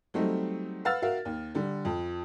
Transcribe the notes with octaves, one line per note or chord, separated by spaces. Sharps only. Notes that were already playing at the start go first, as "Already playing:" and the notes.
F#3 G3 A3 C4 D#4
B4 F5 F#5 E6 F6 A6
F#4 A#4 E5 F5
D#2
D3 G3
F2